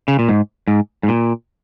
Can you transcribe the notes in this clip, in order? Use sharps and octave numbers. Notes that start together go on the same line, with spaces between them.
C#3
A#2
G#2
G#2
G#2
A#2